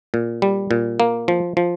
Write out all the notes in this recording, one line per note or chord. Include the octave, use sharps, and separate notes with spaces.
A#2
G3
A#2
A#3
F3
F3